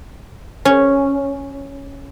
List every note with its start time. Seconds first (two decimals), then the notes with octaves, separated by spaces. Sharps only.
0.65 C#4